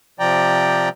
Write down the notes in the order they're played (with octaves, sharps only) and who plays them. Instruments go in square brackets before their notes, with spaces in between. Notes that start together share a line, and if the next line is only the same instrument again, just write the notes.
[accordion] C3 F3 D5 G5 A#5